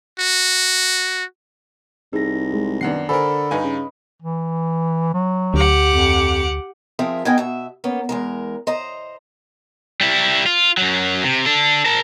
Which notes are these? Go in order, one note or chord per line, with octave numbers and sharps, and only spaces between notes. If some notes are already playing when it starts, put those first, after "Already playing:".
F#4
C2 D#4 G#4 A#6
G#3
F#2 D#3 B3 D4 F#5 C7
D3 A4 A#4 C5 G#5 B5
G2 D#4 B4 D#5 F5 G#5
C#3
E3
F#3
D2 G4 F#5 D6
F2
F3 C4 G#4 A#4 E5
B3 D#4 A#4 D#5 G5 G#5
B2 E5
A#3 B3 C#4
E2 G#3 A#4
C5 D#5 A#5
G3 E4
F4
F#2 F#3
C3
D4 A4
A#4 A5